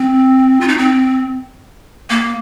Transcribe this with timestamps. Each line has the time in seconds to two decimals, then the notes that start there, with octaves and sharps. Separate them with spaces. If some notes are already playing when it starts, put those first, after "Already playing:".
Already playing: C4
0.61 F4
0.68 D#4
0.78 C4
2.10 A#3